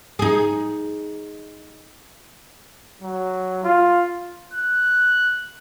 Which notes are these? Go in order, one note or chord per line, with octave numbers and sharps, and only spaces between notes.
D#4 G#4
F#3
F4
F#6